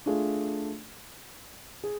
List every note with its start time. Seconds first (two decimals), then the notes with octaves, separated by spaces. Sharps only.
0.06 A3 D4 F4 G#4
1.84 G#4